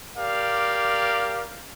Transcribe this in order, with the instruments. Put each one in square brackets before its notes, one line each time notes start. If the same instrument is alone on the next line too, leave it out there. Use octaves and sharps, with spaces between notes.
[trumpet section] G4 A#4 D5 F5